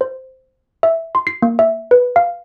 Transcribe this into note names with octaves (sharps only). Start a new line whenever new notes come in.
C5
E5
C6
C7
A#3
E5
B4
F5